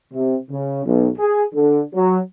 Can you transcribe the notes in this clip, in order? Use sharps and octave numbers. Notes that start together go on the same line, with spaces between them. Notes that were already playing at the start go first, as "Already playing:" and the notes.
C3
C#3
B1
G#4
D3
F#3